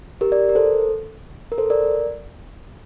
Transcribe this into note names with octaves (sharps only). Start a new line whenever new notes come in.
G4 A#4
A#4 D5
A#4
A4 C5
A#4
A4 C5
A#4 D5